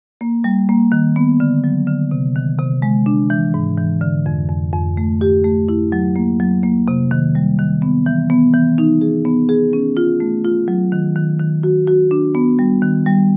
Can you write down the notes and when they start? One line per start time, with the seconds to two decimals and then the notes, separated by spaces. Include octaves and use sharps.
0.21 A#3
0.44 G3
0.69 A#3
0.92 D#3
1.16 B3
1.40 D3
1.64 F#3
1.87 D3
2.11 C3
2.35 D#3
2.59 C3
2.82 G#3
3.06 D4
3.30 E3
3.54 G#2
3.78 E3
4.01 D3
4.26 F2
4.49 F2
4.73 F2
4.97 A3
5.21 G4
5.44 A3
5.69 E4
5.92 F#3
6.16 A#3
6.40 F#3
6.63 A#3
6.88 C3
7.11 D#3
7.35 G3
7.59 D#3
7.82 B3
8.06 E3
8.30 B3
8.54 E3
8.78 D#4
9.01 G#4
9.25 B3
9.49 G#4
9.73 C#4
9.97 F4
10.20 A3
10.44 F4
10.68 F#3
10.92 D#3
11.16 D#3
11.39 D#3
11.63 F#4
11.87 F#4
12.11 D4
12.35 B3
12.59 G3
12.82 D#3
13.06 G3